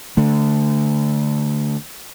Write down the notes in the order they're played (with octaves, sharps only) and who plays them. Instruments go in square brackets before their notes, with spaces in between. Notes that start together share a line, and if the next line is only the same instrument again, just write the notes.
[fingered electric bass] D3 A3